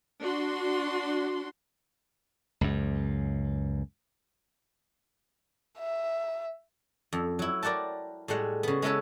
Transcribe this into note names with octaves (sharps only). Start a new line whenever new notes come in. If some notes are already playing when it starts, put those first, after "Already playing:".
D4 F#4 C6
C#2 F#2
E5
F2
F#3 E4
A#4 D5 F#5 G5 A5
A2 G3 G#3 F#5
C#3 B3
G#3 C#4 E4 A4 B4 C#5